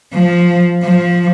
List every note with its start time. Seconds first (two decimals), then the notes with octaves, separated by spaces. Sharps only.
0.14 F3
0.83 F3